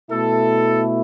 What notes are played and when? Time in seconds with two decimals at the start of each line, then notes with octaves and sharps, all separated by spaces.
0.11 B2 A3 E4 A4